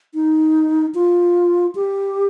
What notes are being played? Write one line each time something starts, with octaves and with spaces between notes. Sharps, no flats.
D#4
F4
G4